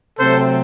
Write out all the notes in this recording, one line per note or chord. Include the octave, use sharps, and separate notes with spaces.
C3 F#3 A3 C4 A4 C5